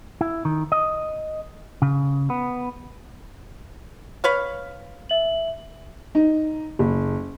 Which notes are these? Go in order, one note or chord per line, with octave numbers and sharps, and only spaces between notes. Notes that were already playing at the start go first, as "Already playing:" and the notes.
E4
D#3
D#5
C#3
B3
B4 C#5 F5
E5 F#7
D#4
F#1